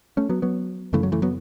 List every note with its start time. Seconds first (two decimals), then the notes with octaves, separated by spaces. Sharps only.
0.17 A3 C#4
0.30 F#3 B3
0.42 F#3 B3
0.93 F#2 C#3 E3 A3
1.03 F#3
1.12 E3 A3
1.22 F#3 B3